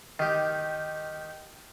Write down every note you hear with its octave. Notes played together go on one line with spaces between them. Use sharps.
D#3 G4